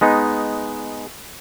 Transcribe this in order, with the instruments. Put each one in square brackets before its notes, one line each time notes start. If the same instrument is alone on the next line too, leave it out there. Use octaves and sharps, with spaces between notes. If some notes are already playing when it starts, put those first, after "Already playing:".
[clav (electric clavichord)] G#3 B3 D#4